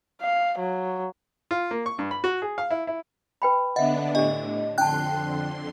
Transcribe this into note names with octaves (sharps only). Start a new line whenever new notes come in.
F5
F#3
F4
A#3
C#6
G2
B5
F#4
G#4
F5
E4
E4
B4 G5 B5
D3 B3 D4 D#5 E5 F#5
A2 D3 D4 G4 D#5
F2 D3 D4 G5 A5 C6 F#6